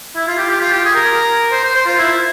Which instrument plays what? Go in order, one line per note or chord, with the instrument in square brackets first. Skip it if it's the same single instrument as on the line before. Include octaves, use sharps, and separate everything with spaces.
[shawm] E4
F4
G4
G4
F4
G4
G#4
A#4
C5
C5
C5
F4
E4